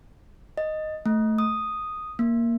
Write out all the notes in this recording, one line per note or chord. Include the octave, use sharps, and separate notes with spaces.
D#5
A3
D#6
A#3